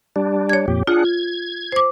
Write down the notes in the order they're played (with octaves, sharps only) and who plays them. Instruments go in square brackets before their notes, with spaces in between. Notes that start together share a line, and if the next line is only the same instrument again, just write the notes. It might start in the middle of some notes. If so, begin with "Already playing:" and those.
[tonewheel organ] G3 D4
[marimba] C#5 G#6
[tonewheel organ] F2 A#2 G4
[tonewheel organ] D4 G#4 F#5 [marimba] F4
[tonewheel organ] G#6
[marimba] C5 D6